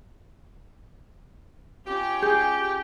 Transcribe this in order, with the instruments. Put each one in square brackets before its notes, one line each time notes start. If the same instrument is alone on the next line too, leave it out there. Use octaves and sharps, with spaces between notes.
[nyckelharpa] C#4 F4 [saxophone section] G4
[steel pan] G#4 [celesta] G6